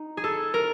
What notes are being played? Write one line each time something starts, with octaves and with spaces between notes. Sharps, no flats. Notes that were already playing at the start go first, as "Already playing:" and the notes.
Already playing: D#4
G#4
A4
A#4